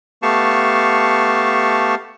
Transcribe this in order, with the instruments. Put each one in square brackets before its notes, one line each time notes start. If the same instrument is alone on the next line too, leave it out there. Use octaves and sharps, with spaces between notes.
[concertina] A3 B3 G4 F5 A5 C#6